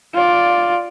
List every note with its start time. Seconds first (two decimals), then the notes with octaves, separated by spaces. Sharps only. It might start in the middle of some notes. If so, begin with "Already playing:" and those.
0.14 F4 D5